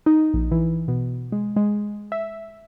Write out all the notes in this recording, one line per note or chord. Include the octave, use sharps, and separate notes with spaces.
D#4
A#1
E3
B2
G#3
G#3
E5